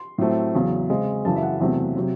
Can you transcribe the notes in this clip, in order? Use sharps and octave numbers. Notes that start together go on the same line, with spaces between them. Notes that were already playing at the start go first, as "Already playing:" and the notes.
Already playing: C6
A2 F#3 A3 C4
E2 C#3 F#3
C#3 G#3 C4
F#2 C#3 E3 A5
E5
F#5
E2 C3 F#3 A3
C3 F#3 C4